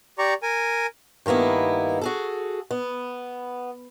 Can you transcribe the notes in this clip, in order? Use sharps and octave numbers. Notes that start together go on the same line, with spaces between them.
G4 D5 A#5 C#6
A#4 G#5
G2 D#3 A#3 B3 E4
F#4 G#4 A4
B3